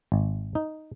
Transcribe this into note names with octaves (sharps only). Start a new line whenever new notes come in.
G#1
D#4